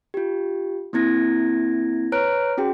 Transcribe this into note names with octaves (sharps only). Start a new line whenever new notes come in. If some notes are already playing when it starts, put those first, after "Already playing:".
F4 G4
A#3 C4 E4 G#6 A#6
B4 C#5 A#5 F6 F#6 D7
C#4 F#4 G#4 G5